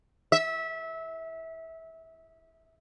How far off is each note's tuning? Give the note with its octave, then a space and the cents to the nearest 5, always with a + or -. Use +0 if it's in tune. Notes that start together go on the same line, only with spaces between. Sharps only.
E5 -20